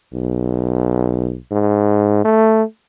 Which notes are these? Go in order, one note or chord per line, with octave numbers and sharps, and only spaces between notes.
B1
G#2
A3